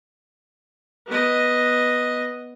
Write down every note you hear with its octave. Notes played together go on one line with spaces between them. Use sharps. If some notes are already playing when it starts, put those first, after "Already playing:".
B3 D#5